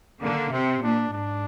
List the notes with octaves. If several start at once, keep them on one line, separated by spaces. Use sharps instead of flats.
D3 A#3
C3 C4
A#2 D4
G#2 D4